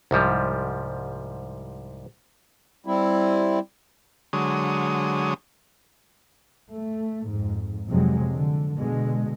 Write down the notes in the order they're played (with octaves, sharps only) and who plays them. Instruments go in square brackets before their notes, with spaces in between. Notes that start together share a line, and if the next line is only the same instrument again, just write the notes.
[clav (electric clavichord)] C2 G#2 F3 G3
[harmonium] G3 C4 E4
[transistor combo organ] D3 F#3 G#3 C#5 D#6
[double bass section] A3
F2 G#2
F2 C3 F#3 G#3
D3
B2 D3 G#3